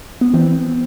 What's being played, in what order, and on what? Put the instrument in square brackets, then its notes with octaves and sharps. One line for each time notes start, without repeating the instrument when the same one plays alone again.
[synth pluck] B3
E3 C4